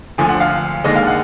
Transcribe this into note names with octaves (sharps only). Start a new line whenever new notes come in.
D2 D3 F3 G#5
F#5
F5
D#2 D3 G#3 D#5
F5
F#5